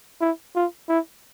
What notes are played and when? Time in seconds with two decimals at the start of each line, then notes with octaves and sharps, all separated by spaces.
0.21 E4
0.56 F4
0.89 E4